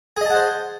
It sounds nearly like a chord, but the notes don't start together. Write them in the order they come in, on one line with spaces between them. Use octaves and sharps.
G#4 D#5 A5 F#5 C5